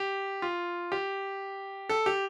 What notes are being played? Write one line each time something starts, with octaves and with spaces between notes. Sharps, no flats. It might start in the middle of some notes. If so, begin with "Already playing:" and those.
Already playing: G4
F4
G4
A4
G4